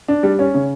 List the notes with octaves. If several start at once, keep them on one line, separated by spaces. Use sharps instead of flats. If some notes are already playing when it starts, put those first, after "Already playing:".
D4
G3
C#4
C#3